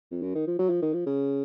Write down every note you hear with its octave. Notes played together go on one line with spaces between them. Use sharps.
F2
F#2
D#3
F3
F#3
F3
D#3
F3
C#3